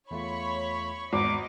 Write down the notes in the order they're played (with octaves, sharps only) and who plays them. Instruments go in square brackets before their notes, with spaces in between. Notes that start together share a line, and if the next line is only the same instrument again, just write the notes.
[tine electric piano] E2 A3 F4 [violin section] C#5 B5 C#6
[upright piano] G#1 [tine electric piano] E2 G#3 B3 [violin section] D#5 [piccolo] D6